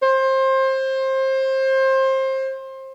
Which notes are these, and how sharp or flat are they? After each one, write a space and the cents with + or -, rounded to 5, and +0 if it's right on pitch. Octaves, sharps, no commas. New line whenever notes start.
C5 +25